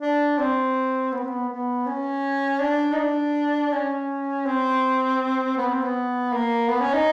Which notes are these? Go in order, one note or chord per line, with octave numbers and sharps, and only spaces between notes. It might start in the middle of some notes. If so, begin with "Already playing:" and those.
D4
C4
B3
C4
B3
B3
C#4
D4
D#4
D4
C#4
C4
B3
C4
B3
A#3
B3
C#4
D#4